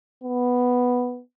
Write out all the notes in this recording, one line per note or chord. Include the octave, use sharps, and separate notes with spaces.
B3